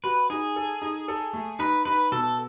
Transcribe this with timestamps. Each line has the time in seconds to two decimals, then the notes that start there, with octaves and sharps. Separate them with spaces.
0.04 F#4 B4
0.30 D#4 G#4
0.56 A4
0.82 D#4
1.08 A4
1.33 A3
1.59 D#4 B4
1.85 D#4 B4
2.12 B2 A4